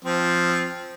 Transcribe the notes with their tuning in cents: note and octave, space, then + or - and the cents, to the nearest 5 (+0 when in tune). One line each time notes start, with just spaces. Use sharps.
F3 +0 C4 +0